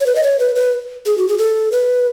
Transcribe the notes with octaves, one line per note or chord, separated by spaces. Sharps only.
C#5
B4
D#5
C#5
B4
B4
G#4
F#4
G#4
A4
B4